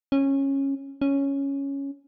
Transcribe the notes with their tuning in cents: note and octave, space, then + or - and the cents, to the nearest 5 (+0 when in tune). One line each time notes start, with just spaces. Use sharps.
C#4 -15
C#4 +0